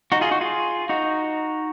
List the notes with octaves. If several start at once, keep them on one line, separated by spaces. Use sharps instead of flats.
D#4 F#4
F4 G#4
D#4 F#4
F4 G#4
D#4 F#4